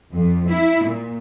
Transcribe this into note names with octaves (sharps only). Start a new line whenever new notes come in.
F2
E4
A#2